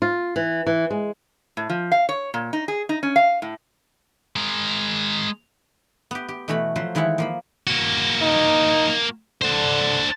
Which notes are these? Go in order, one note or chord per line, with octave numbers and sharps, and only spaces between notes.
F4
E3
E3
G#3
A2
F3
F5
C#5
A#2
D#4
G#4
D#4
C#4
F5
A2
G#3 A#4
B3 G4
G4
B2 E3 A3 F#4 B5
F3 F#3 B4 C5
D#3 E3 G#3 E4 F#5
F3 A#3 B5
A#3 F#4
D#4
D3 D4 C5